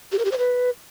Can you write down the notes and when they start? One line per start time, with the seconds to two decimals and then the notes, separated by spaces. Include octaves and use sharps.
0.12 G4
0.19 A#4
0.25 G4
0.32 C5
0.38 B4